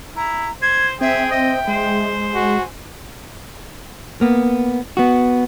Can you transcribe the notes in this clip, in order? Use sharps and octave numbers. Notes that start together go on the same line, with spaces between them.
E4 A#5
C5 G#6
C4 G#4 E5 G5
D#5 E5
G#3 C5
F#4 G#5
A#3 B3
B3 F#4